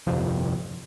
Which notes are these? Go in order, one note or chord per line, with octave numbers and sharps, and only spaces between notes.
G1 C2 F2